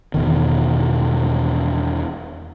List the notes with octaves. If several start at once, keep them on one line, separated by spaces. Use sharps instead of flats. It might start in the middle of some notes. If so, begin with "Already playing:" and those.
E1 B2 D#3